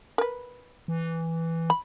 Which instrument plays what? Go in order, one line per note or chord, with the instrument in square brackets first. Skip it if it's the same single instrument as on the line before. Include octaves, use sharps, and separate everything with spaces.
[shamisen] A#4 B4
[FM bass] E3
[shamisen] B5